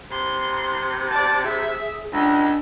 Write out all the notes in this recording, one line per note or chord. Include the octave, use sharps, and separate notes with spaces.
C3 C6
D5 A5
G#4 E5
C#2 G#3 D4 E6